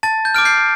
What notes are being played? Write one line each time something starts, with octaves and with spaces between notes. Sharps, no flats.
A5 A6
G6
D6 F6 D7
G6 C7